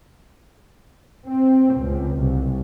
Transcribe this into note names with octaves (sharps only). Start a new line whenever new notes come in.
C4
C#2
C2